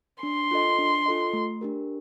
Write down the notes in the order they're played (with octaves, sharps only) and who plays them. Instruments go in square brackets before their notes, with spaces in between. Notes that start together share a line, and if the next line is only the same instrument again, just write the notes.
[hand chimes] D4 [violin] C6
[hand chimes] F4 A4 D#5
D4
F4 A4 D#5
A3
D4 G4 A#4